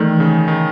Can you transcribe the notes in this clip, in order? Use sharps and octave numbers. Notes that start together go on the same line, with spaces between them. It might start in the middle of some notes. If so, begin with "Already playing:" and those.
Already playing: D#3 E3 A3 D#4 A4
C#3
D#3